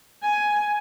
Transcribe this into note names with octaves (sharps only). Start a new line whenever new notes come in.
G#5